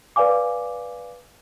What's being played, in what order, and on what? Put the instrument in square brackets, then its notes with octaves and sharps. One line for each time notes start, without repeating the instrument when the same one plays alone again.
[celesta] B4 D5 F5 G#5 D6